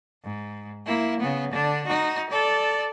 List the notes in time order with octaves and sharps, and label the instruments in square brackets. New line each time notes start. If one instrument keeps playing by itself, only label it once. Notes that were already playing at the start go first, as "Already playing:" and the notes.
[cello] G#2
A#3 E4
C#3 B3
D3 D4
D#4 F#4
A4 D5